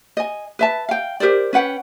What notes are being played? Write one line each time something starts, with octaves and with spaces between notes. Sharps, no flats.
D#5 G#5
B4 E5 A5
F5 G5
G4 A#4 C5 D5
C#4 B4 F#5 G5